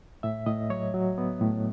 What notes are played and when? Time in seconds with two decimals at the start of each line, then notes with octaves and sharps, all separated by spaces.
0.23 A2 E5
0.46 A2 D#5
0.70 F#3 C#5
0.94 F#3
1.18 B3
1.41 A2